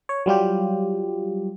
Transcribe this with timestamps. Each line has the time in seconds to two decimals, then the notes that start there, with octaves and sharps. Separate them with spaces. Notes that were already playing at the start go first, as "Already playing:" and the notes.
0.09 C#5
0.26 F#3 G3 F4 G4